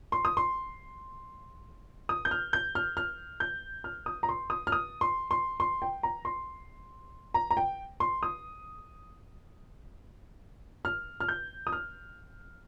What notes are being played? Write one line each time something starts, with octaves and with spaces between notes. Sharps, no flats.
C6
D#6
C6
D#6
G6
F6
G6
F6
F6
G6
F6
D#6
A#5
C6
D#6
F6
D#6
C6
C6
C6
G5
A#5
C6
A#5
A#5
G5
C6
D#6
F6
F6
G6
D#6
F6